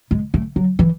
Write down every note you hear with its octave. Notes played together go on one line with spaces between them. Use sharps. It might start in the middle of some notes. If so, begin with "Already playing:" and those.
G#3
A3
F#3
E3